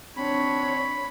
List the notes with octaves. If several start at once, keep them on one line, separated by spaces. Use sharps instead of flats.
C4 D4 C#5 B5